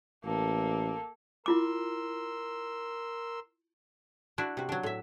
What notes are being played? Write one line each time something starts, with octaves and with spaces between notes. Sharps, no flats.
A1 A#3 A4
E4 F4 A#4 C6 D6 E6
D4 E4 F#4
C3 F#4
F#3 D4
A2 E5